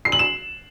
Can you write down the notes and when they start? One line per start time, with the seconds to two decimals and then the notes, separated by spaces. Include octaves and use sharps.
0.05 C7
0.12 F#7
0.19 E7